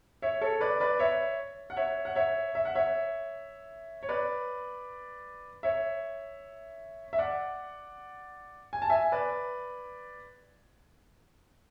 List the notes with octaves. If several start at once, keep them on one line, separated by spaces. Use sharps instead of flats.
C#5 E5
A4 C#5
B4 D5
B4 D5
C#5 E5
F#5
C#5 E5
F#5
C#5 E5
E5
F#5
C#5 E5
C#5
B4 D5
C#5 E5
E5
D5 F#5
G#5
A5
E5 G#5
B4 D5